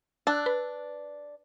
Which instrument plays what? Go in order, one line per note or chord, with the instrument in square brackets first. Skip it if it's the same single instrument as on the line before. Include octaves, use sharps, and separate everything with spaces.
[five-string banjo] D4 [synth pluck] E6 F#6 A6
[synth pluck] B4